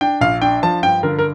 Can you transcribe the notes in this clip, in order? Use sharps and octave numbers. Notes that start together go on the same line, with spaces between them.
D4 G5
A#1 F5
D4 G5
F3 A5
G2 G5
D3 A#4
A#4